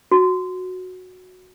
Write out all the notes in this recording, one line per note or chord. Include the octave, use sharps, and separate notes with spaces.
F#4